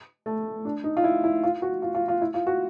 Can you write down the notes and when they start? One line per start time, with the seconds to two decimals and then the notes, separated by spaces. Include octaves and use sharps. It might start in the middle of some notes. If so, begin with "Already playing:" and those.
0.26 A3
0.65 D4
0.84 D#4
0.97 F4
1.04 E4
1.24 E4
1.43 F4
1.62 F#4
1.82 F4
1.95 F4
2.08 F4
2.21 E4
2.34 F4
2.47 F#4